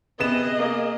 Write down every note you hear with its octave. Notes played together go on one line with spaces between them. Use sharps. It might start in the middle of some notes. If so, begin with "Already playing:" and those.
C3 B3 G#4 D#5 E7
A#3